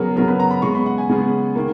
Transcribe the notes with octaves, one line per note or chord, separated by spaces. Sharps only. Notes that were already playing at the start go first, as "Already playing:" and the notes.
Already playing: C#3 F#3 B3 G#4 A#4
C#3 F#3 B3 A#4
B4
A#5
B5
C#3 G#3 B3 C#6
B5
F#5
G#5
C#3 G#3 B3
D#3 A#3